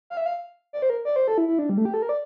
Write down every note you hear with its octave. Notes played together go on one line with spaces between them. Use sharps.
F5
E5
F5
D5
C5
A#4
D5
C5
A4
E4
E4
D4
G3
A3
G4
A4
A#4
D5